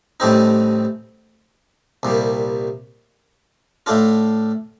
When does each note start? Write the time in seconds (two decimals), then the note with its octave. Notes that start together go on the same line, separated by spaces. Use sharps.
0.20 A1 A2 G3 C4 D#4
2.03 C2 A#2 G3
3.86 A2 A3 D4 F4